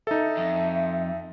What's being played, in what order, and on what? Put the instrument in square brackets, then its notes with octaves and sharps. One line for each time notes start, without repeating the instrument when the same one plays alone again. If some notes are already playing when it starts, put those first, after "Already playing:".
[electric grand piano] D#4 A4 [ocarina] E5
[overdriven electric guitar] F2